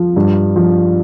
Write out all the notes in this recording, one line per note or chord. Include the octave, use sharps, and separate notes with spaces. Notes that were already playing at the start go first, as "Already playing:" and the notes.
Already playing: F3
G2
F3